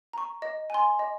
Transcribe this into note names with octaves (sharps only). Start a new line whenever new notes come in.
A#5 C#6
D#5
G#5 C6
D#5